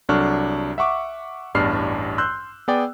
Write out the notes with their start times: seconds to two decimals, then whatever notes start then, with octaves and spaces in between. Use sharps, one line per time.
0.09 C2 F#3 D4 A4 C#6 F6
0.78 E5 F#5 C#6 D6
1.55 A1 E2 G2 D4 F6 C7
2.18 C6 E6 F#6 G6
2.68 B3 G#4 D5 G5